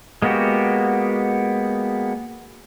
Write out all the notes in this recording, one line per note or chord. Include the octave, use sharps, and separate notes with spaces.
G#3 A#3 B3 F#4 G4